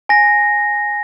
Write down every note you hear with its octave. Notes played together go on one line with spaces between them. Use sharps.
G#5 A#6